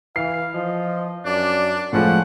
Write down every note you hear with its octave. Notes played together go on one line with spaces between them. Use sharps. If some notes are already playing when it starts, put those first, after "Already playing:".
E3 F5 C7
F3 D#5
F#2 D4 D5
C#2 A2 F3 G#3 C#4 F#5